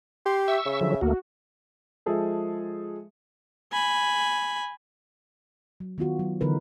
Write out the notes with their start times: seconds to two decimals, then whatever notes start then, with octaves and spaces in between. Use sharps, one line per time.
0.25 G4 C6
0.48 E5 C#6 E6
0.66 C#3
0.81 D3 F3 F#3
1.01 D2 A3 A#3 F#4
2.06 F3 G#3 G#4 A4 E5
3.72 G#5 B5
5.80 F#3
5.98 D#3 B3 F4 F#4
6.19 F#3
6.41 D3 E3 B3 D#4 A#4 B4